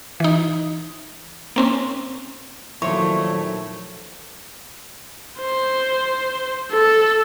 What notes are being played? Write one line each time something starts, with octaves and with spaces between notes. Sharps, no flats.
E3 D#4
A#3 C4 C#4
A#2 D#3 F3 F#3 A3 E4 C5 C#5
C5
A4